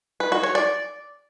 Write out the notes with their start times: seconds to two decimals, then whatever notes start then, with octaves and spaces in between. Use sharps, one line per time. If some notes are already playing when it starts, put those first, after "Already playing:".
0.20 B4
0.32 F#4
0.43 C#5
0.55 D5